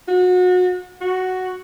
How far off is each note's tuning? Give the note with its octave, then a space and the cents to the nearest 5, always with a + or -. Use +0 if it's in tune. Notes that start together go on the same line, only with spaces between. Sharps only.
F#4 -30
F#4 +5